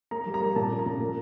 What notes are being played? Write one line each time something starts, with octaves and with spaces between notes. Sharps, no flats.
A#3 A#5
G3
A#5
A#3
A#2 A5
C#4
A#5
A#2
A#3